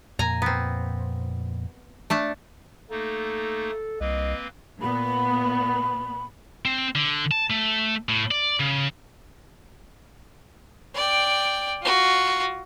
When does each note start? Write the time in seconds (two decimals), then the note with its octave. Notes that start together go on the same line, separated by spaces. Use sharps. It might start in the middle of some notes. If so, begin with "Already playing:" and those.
0.19 F2 A#2 G#5 A#5
0.42 B3 C4
2.10 A3 D4 A5
2.91 A3 A#3 D#4 A4
4.01 C2 A#3 C4 B4 D#5
4.82 A#2 B3 B5
6.65 C4
6.95 D3
7.31 A5
7.50 A3
8.09 A2
8.31 D5
8.60 C#3
10.95 D5 G5
11.82 F4 F#4